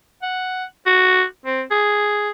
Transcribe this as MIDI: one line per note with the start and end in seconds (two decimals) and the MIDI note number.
0.22 0.64 78
0.86 1.24 66
1.45 1.62 60
1.71 2.30 68